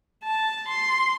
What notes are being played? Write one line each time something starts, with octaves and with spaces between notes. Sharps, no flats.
A5
C6